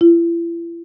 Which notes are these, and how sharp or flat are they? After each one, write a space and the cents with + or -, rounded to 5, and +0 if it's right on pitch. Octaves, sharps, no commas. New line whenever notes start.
E4 +40